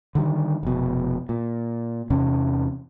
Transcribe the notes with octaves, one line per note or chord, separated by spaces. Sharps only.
D3 D#3 G3
F1 B2
A#2
E2 C3 C#4